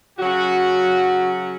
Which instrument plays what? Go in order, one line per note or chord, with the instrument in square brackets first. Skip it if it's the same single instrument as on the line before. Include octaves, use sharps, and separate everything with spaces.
[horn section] C#3 F#3 C#4 F#4